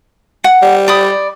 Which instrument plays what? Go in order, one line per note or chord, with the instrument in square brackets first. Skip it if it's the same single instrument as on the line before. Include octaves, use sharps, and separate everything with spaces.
[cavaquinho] F#5
[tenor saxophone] G3
[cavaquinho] D5 B5 D#6